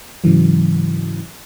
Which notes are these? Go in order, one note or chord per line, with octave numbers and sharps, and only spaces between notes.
G#2 C#3 E3 F#3